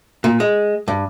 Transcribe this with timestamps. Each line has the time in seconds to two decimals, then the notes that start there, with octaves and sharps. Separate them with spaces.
0.24 A#2
0.40 G#3
0.88 G2